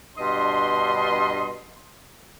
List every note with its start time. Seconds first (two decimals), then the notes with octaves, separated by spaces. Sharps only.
0.18 G2 B2 D4 D#5 C6